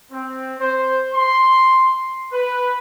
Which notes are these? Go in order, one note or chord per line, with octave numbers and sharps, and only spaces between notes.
C4
C5
C6
B4